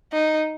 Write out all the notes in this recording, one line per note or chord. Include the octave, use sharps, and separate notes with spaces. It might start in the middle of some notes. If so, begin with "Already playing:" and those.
D#4